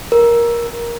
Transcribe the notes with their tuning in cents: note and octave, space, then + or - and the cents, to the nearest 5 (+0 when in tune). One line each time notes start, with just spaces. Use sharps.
A#4 +15